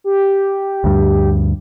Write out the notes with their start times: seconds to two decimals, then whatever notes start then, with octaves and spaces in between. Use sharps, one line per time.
0.04 G4
0.84 D2 G2